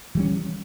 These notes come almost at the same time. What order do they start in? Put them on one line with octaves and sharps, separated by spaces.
E3 G3 C#4